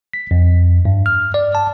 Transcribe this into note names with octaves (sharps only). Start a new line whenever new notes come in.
B6
F2
G2
F6
D5
A5